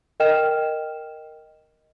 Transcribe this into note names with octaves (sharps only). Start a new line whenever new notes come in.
A#4 D#5 G5 F6 E7